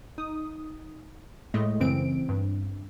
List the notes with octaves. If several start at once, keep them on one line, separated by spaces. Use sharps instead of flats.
D#4 D#6
A2 G#3 A3 D#5
F#2 C#3 E3 C4 D7
G2